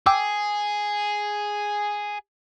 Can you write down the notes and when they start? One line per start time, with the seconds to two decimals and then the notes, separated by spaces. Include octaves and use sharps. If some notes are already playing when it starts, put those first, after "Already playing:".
0.06 G#4 G5 D6 E6